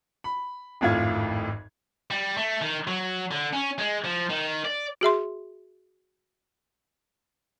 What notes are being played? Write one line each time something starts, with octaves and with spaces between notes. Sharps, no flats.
B5
G#1 F2 A2 F4 G#6
G3
A3
D#3
F#3
D3
C#4
G#3
F3
D#3
D5
F#4 G#4 E5 C6